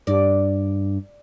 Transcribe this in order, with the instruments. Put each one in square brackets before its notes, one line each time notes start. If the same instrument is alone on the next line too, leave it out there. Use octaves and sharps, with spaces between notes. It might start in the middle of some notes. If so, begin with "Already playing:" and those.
[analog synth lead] G2 [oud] D5